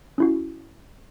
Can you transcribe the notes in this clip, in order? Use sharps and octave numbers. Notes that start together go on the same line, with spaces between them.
C#4 E4 F#4